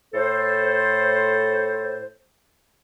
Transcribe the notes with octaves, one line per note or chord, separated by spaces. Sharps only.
A2 A4 C5